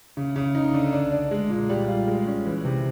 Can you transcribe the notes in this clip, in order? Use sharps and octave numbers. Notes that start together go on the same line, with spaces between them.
C#3
C#3
D#4
D3
D4
D4
G#3
A#2
G3
F4
G#3
C#4
E3
C3